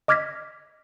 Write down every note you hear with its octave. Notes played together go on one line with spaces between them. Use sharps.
D#5 D6 F6 G#6 A#6 B6